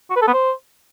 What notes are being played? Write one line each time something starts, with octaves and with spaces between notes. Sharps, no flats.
F#4
B4
A4
B3
C5